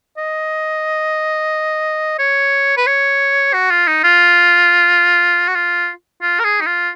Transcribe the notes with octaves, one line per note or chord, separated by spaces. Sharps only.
D#5
C#5
B4
C#5
F#4
F4
D#4
F4
F#4
F4
F4
A#4
G#4
D#4
F4